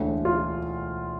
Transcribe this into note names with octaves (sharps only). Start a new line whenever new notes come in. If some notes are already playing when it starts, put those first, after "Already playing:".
Already playing: E1 D2 D3
F4